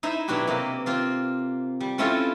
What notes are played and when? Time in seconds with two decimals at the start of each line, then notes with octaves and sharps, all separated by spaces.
0.03 D#4 E4 C5 A#5
0.28 B2 F#3 D4 F#4 G4
0.47 C3 A#3 G4 D#5
0.86 C4 F4 C5
1.80 G3
1.98 C4 C#4 E4 F4 A4 C5